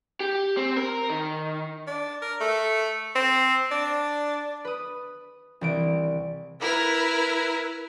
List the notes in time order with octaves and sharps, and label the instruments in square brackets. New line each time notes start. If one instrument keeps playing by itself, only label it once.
[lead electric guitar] G4
C4
A#4
D#3
[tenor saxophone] D4
A#4
A3
C4
D4
[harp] B4 D#6
C2 E3 D7
[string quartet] E4 A#4 B4